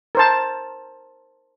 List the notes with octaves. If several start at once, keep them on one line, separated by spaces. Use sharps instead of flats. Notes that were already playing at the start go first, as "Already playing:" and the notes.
A#4 C5 A5